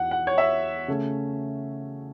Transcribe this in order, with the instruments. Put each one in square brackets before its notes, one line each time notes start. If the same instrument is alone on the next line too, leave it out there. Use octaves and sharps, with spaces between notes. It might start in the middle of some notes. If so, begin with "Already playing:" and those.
Already playing: [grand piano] E2 E3 F#5
F#5
C#5
E5
C#3 A3 C#4